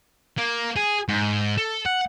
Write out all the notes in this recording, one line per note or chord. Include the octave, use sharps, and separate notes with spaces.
A#3
G#4
G#2
A4
F#5